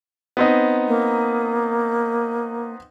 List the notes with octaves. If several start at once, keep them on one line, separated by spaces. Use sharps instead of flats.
B3 C4 D#4
A#3